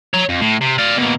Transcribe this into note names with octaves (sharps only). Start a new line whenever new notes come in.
C#5 A#5
F2
A2
C3
D5 F5
B2 A#3